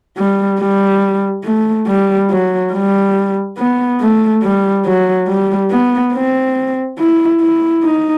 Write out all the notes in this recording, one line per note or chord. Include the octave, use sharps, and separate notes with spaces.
G3
G3
A3
G3
F#3
G3
B3
A3
G3
F#3
G3
B3
C4
E4
E4
D#4